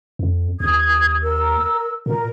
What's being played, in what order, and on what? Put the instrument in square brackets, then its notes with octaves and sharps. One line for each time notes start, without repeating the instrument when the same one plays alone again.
[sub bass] F2
[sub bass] D#2 [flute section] D#6 G#6
[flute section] A#4 E6
[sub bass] A#2 [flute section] A#4